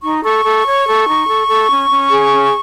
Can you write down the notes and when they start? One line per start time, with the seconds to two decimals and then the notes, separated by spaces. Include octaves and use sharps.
0.02 D#4 C#6
0.23 A4 C#6
0.44 A4
0.65 C#5
0.85 A4
1.06 D#4
1.26 A4
1.47 A4
1.69 C#4
1.89 C#4
2.10 G#4
2.30 C#4